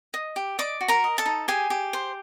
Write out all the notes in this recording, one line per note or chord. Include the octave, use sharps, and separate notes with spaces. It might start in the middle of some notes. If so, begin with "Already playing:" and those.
D#5
G4
D5 D#5 D6
F#4
A#4 A#5
D#5
A4 A5
D#4
G4 G#4 G#5
G4
C5